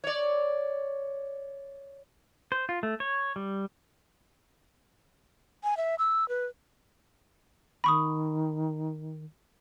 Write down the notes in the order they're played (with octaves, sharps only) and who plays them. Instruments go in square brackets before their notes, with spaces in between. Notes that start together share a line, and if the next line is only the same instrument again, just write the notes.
[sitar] C#5 D5
[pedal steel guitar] C5
F4
A3
C#5
G3
[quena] G#5
E5
E6
B4
[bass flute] D#3 [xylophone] B5 C#6 D#6